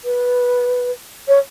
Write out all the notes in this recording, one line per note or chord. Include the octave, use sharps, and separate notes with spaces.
B4
C#5